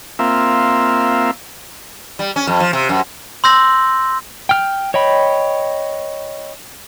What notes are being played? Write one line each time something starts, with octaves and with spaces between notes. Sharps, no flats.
A#3 C4 F4 E5
G3
C#4
F2
F3
C3
F#2
C6 E6 G6 A#6 F#7
G5 F6
C#5 D#5 G5 B5